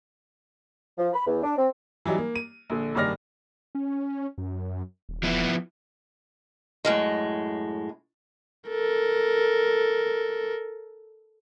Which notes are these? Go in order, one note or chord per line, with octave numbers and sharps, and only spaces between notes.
F3
B5
E2
D4
C4
E3 F#3 G3 D#4
A#3
D#7
A#1 D3
F#1 G2 D#3 D5 F6 A#6
C#4
F#2
D#1
F3 B3 E4
F#2 A2 G#3
A4 A#4